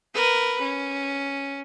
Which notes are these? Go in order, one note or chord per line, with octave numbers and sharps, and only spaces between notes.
A#4 B4
C#4